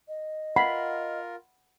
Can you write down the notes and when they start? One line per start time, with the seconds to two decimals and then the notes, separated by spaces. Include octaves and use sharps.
0.08 D#5
0.56 F4 A#4 F#5 B5